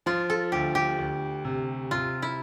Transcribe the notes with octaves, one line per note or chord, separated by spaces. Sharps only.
F3 F4
A4
D2 G4
G4
D2
C3
C3 F4
E4